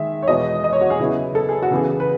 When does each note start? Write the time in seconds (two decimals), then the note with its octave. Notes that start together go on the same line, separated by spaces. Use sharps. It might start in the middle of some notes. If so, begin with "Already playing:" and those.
Already playing: D#3 G#3 E5
0.22 C#5
0.28 E2 B2 G#3 B3 D#5
0.64 D#5
0.73 C#5
0.81 F#4
0.90 G#4
0.99 C#3 F#3 B3 E4
1.35 A4
1.49 G#4
1.62 F#4
1.71 C#3 E3 B3 G#4
2.00 B4